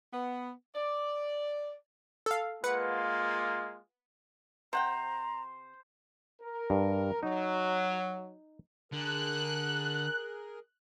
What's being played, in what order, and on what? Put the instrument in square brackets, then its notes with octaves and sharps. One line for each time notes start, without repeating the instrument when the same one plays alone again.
[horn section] B3
D5
[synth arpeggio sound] A4 F5
[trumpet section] G#3 A#3 F4 [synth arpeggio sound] B4 F#5 C#7
[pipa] C3 F#5 G5 [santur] C5 [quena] A#5
[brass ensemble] A#4
[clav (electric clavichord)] G2
[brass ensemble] F#3 [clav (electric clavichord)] D#4
[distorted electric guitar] D3 [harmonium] G#4 A#4 [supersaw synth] F#6